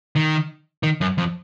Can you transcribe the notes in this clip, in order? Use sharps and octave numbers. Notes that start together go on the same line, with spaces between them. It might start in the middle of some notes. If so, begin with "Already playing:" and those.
D#3
D#3
F#2
F2